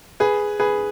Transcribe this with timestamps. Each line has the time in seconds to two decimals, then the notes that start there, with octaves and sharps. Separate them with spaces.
0.20 G#4 B4
0.60 G#4 B4